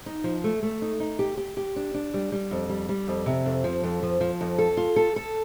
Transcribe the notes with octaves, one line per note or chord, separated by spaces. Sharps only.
D#4
F3
A3
A3
D#4
D#4
G4
G4
G4
D4
D4
G3
G3
F2
G3
G3
F2
C3
F2
F3
F2
F3
F3
F2
A4
F4
A4
A4